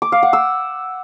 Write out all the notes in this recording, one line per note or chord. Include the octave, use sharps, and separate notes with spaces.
D6
F5
F#5
E6